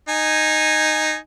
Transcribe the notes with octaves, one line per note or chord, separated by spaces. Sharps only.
D#4 G#5